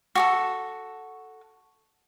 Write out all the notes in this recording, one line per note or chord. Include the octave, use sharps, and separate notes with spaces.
F#4 G4 A4